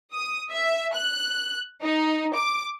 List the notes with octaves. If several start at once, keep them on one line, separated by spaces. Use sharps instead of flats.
D#6
E5
F#6
D#4
D6